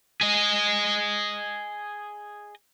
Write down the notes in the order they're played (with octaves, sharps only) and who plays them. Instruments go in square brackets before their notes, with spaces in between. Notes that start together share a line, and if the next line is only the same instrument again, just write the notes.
[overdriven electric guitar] G#4 D#5